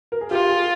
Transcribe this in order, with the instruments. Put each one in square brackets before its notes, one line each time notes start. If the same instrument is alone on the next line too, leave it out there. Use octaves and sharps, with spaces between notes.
[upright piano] A#4
G#4
[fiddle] F4 [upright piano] G4
[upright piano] G#4